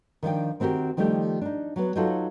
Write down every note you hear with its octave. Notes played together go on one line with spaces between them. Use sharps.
D#3 F3 D4 G5
D#3 C4 F#4 G4 A#4
D#3 F3 G3 A3 D#4 G4
D4 D#4
F#3 B3
F#3 D#4 F4 F#4 A4